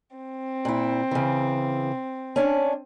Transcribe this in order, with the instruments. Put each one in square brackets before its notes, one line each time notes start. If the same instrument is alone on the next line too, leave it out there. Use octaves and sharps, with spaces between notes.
[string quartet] C4
[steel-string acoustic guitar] A#2 E4
C#3 E3
C#4 D4